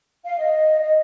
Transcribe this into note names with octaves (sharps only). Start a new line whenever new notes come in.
F5
D#5
D#5